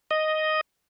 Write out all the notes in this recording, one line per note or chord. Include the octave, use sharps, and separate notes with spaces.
D#5